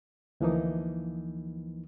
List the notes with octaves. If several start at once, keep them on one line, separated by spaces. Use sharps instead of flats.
D2 E3 F3 A#3 D#4